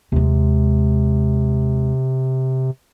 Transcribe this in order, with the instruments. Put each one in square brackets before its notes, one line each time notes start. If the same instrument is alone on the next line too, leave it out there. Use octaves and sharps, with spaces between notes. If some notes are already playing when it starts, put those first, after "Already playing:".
[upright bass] D#2 G#3 [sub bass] C3